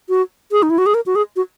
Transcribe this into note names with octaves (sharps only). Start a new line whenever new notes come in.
F#4
G#4
D#4
E4
F#4
G#4
A#4
F#4
G#4
F#4